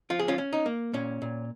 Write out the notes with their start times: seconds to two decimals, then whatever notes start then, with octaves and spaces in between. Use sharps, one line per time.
0.10 F3 F4
0.19 G#4
0.28 C#4 F4
0.38 C#4
0.53 D#4
0.66 A#3
0.94 A#2 C#4
1.22 A#2